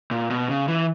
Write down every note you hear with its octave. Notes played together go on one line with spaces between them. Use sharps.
A#2
B2
C#3
E3